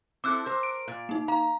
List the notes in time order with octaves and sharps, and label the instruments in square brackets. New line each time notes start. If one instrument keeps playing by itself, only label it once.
[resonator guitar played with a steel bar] C4 E4 A4 [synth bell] D6 E6 F#6
[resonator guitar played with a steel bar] A#4 C5
[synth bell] D7
[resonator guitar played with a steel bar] A#2
[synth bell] A#3 D#4
[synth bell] F5 [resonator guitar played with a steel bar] A#5